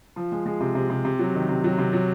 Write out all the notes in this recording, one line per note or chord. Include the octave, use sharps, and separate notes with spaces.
F3
G#3
G#3
C3
C3
C3
C3
F#3
D#3
C3
F#3
C3
F#3